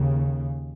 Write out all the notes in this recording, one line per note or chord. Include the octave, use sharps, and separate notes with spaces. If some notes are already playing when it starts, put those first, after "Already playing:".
Already playing: D#2 C#3